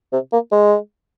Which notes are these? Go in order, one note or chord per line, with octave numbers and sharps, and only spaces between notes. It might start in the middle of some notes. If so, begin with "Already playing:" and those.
C3
A#3
G#3